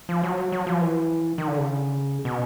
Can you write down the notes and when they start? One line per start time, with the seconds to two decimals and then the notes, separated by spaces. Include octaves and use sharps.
0.09 F3
0.23 F#3
0.52 F#3
0.67 F3
0.81 E3
1.38 D#3
1.47 D3
1.58 C#3
2.25 B2